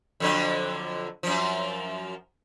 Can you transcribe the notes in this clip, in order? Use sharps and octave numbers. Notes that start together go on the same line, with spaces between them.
F2 D3 F#3
F#2 F3